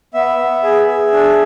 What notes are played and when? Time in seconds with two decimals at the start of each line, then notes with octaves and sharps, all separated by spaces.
0.14 B3 E5
0.39 B3
0.63 G#4
0.88 G#4
1.13 D4